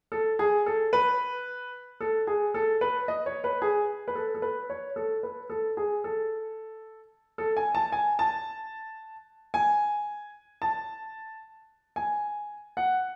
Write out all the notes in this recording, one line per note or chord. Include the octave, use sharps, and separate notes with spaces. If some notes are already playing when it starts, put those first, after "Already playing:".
A4
G#4
A4
B4
A4
G#4
A4
B4
D#5
C#5
B4
G#4
B4
A4
A4
B4
C#5
A4
B4
A4
G#4
A4
A4
G#5
A5
G#5
A5
G#5
A5
G#5
F#5